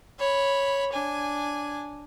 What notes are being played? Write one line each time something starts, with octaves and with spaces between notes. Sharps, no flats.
C#5 B5
D4 G#5